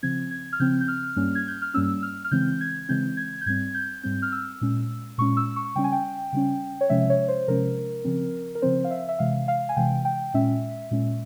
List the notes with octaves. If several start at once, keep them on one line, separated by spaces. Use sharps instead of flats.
C#3 F3 C4 G#6
G#6
F6
C#3 F3 C4 G6
G6
F6
G2 G3 A#3 C#4
G#6
G6
F6
G2 G3 A#3 C#4 E6
F6
F6
C#3 E3 G#3 C4 G6
G#6
C#3 E3 G#3 C4 G6
G#6
G6
G#2 G3 C4 G#6
G6
G#2 G3 C4 G6
F6
E6
A#2 G#3 C#4
A#2 G#3 C#4 C#6
E6
C#6
C#3 G3 C#4 G5
G#5
G5
C#3 G3 C#4
C#5
C3 F3 G#3 C#4 E5
C#5
C5
C3 F3 G#3 C#4 A#4
C#3 F3 C4
A#4
C#3 F3 C4 C5
F5
E5
E5
C3 E3 G#3 F5
F5
G#5
C3 E3 G#3 G5
G5
A#2 G#3 C#4 E5
A#2 G#3 C#4